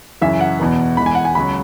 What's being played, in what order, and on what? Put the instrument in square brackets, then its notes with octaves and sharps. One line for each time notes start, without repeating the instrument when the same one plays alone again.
[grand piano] F#2 C#3 E3 E5
F#5
E2 B2 B3
E1 E2 E3 G#3 B5
G#5
F#5
G#5
C#2 C#3 F#3 B5